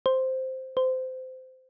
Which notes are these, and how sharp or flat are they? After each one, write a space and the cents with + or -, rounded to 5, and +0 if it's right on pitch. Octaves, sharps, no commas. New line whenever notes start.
C5 +0
C5 -20